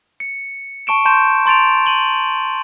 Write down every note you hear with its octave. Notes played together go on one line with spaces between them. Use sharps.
C#7
A5 C#6 D7 E7
A5 C6 C#6 G6 E7
A#5 C6 A6 D7 F7
D#7 F#7 G7